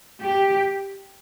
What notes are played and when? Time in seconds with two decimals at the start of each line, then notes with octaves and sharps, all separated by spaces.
0.21 G4